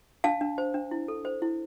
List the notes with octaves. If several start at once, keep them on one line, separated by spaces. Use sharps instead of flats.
D4 F5 A5
D4
C5
D4
E4
A4
C5
E4